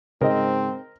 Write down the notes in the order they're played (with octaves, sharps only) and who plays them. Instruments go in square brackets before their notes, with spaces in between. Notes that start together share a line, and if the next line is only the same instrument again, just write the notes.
[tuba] G#2 [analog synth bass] C#3 [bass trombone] C4 [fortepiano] A#4 D#5